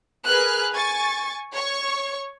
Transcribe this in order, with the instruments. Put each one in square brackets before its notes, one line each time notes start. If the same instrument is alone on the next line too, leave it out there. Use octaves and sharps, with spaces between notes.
[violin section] G#4 A#4 B4 G#5 F6 F#6
G#5 C#6 A6
C#5 C#6